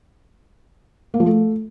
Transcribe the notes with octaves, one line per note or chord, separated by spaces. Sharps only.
A#3
F3
A3